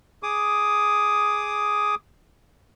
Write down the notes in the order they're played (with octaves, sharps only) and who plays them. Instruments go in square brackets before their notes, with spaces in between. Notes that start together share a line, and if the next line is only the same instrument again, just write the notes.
[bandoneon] G#4 D6 D#6